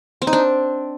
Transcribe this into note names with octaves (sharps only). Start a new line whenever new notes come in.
C4
D#4
D4